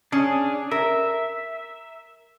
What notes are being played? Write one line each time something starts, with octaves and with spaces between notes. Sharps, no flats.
C#4 D4 G#4
A#4 E5